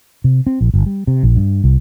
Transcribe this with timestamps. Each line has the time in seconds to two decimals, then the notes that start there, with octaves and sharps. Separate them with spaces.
0.24 C3
0.47 C4
0.61 A#1
0.74 G1
0.86 G3
1.07 C3
1.23 A#1
1.36 G2
1.64 C2